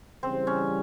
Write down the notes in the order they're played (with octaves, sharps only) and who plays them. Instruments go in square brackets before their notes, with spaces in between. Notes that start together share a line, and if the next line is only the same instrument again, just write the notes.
[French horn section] C#3 E3 G3 [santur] C4
[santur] C#4